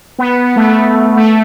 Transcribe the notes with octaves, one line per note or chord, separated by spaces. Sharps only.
B3
B3
A3
A3
A3